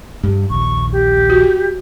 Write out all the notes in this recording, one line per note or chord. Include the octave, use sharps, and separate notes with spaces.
G2 G3
A#1 D#2 C#6
G4
F#4